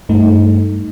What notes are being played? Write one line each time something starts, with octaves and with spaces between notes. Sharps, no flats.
G2 A3 D#4